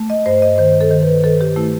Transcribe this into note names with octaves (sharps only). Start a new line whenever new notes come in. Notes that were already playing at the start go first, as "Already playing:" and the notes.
Already playing: A3
D#5
G2 C5
D#5
D#3 C5
A4
D#3
B4
D#3 A4
G4
A3 E4